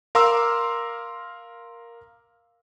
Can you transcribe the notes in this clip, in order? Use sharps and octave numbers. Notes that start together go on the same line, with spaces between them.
A#4 F5 A#5 C6 D6 E6